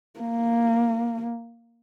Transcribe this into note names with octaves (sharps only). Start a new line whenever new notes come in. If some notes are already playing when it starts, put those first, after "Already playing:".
A#3